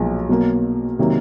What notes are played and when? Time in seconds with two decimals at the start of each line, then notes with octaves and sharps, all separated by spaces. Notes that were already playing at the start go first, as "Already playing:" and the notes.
Already playing: B1 A#2 F3 G#3
0.29 B2 F#3 A#3
0.99 C3 D#3 F#3 A#3